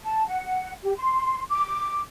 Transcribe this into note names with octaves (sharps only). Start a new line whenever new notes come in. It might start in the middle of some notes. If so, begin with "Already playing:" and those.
A5
F#5
G4
C6
D6